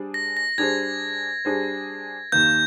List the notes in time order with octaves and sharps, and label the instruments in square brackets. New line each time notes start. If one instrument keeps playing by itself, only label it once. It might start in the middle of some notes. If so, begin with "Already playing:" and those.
Already playing: [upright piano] G3 D4 G#4 C5
[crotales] A#6
A#6
[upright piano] G3 D4 G#4 C5 [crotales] G#6
[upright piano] G3 D4 G#4 C5
[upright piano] D#2 D#3 A#3 [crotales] G6